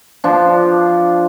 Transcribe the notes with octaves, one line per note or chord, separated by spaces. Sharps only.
F3 D4